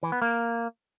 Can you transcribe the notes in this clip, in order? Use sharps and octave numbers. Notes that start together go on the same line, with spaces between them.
E3
B3
A#3